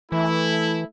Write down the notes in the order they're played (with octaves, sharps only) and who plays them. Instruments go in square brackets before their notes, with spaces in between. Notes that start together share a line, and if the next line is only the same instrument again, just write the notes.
[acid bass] E3 [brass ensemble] A3 E4